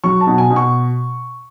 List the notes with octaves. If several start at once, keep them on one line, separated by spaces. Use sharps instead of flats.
F#3 C#6
A5
B2
G#5
B2
C#6